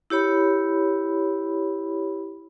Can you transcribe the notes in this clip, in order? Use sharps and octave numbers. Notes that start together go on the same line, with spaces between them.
E4 G4 C#5 B5